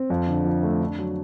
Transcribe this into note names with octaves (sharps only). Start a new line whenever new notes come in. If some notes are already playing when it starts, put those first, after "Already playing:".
Already playing: C4
F2
D3
F3
A3
D4
F#3